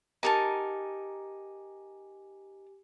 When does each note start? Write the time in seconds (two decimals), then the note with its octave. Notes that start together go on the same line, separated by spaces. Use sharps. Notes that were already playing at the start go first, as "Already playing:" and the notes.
0.23 D#4 G4 A#4 G#5 A5